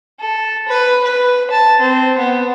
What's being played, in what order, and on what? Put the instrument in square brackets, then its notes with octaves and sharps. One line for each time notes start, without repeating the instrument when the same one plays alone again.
[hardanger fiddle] A4
B4
B4
A5
C4
B3